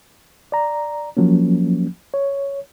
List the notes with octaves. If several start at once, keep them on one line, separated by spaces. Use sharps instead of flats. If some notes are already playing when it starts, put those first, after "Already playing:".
D5 A#5
F3 F#3 A#3 C#4
C#5